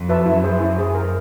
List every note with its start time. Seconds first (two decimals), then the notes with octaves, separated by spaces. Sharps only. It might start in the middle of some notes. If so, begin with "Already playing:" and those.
Already playing: F2
0.09 F#4 B4 E5 A5
0.26 F#2 E4
0.44 G#4 C5
0.61 E4
0.78 G#4 C5
0.95 A#4